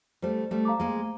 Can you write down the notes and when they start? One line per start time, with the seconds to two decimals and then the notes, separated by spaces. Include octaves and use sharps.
0.22 G3 A3 C5
0.51 G3 A3
0.65 F5 A#5 D6
0.80 G#3 A#3